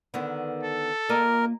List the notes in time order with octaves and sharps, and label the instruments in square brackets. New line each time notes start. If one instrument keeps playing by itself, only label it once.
[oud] D3 D#3 B3
[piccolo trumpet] A4
[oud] A#3 F4 D#5 [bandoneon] A#4